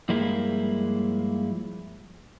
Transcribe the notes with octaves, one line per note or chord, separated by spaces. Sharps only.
G2 F3 G#3 A#3 E4